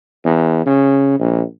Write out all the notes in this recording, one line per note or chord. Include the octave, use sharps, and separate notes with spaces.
E2
C#3
A#1